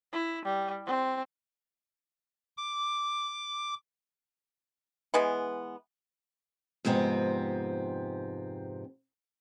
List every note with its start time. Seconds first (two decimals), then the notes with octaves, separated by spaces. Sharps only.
0.13 E4
0.45 G3
0.86 C4
2.57 D6
5.14 E3 G#3 B3
6.85 F2 G#2 C3 B3 C4